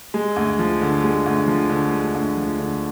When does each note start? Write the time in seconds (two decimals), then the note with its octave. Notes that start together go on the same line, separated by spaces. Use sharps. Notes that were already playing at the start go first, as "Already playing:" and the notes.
0.14 G#3
0.36 D2
0.59 F3
0.82 D3
1.04 G#3
1.26 D2
1.48 F3
1.70 D3
1.93 G#3
2.15 D2
2.37 F3
2.59 D3